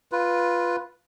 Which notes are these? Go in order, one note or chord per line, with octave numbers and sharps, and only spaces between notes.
F4 B4